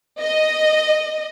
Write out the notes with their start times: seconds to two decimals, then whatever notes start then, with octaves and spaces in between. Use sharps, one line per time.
0.22 D#5